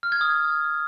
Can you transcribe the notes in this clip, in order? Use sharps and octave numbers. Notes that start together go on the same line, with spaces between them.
F6
G#6
D#6